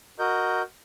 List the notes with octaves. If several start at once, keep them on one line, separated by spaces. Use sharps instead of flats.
F#4 A#4 D#5 G6